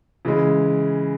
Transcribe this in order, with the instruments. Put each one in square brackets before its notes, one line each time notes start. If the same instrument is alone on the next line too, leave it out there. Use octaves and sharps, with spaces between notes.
[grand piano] C#3 E3 G#3